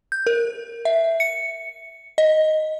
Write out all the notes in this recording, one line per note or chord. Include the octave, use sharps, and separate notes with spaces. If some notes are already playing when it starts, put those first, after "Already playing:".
G6
A#4
E5
C#7
D#5